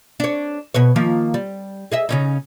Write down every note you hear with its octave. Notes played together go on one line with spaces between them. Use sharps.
D4 C#5
B2 B4 C#5
D#3 F3 A#3
G3
G#4 D#5 E5
C#3 C#4 D#4